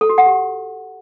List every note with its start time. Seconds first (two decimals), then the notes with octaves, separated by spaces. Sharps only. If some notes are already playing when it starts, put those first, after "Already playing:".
0.01 A4
0.09 F#4
0.18 F#5
0.26 G4